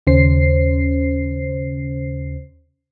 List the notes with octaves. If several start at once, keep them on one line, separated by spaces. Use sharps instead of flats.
D#2 C#3 C#4 C5 C7